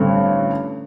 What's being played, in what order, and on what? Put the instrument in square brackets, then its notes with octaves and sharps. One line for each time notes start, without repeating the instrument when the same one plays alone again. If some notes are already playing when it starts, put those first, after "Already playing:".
Already playing: [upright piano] A1 G2 D3 C4